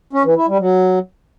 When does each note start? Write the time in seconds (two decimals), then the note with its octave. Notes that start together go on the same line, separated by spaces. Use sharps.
0.13 C#4
0.24 E3
0.36 E4
0.48 G3
0.59 F#3